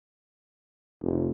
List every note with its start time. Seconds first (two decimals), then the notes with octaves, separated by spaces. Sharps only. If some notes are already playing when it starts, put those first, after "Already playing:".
1.02 F1